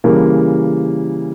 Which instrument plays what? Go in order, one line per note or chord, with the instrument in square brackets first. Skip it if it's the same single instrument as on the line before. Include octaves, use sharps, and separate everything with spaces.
[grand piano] C#3 E3 G3 A#3